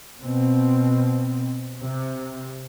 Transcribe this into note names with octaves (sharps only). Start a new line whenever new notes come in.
B2 C4
C3